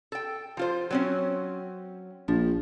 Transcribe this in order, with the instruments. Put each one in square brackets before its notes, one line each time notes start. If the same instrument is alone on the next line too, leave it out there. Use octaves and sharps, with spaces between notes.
[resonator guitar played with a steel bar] A4 G5
F3 F4 C5
F#3 C4 C#4
[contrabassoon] A#1 [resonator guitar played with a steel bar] F3